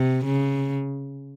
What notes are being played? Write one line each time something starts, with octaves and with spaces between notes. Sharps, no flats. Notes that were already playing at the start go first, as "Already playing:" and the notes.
Already playing: C3
C#3